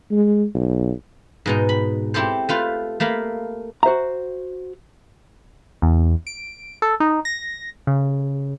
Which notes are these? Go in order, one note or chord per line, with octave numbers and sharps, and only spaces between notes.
G#3
B1
G#2 B2 D#4
B5
C4 E4 G4 A4 C5
A3 F4 B4 C5
A3 A#3 F5 B5
F#4 C5 E5 A#5
E2
D7
A4
D#4
A#6
C#3